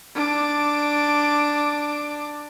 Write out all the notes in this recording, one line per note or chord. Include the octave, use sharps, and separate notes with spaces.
D4 D6